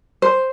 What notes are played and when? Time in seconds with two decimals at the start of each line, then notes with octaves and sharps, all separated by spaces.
0.22 C5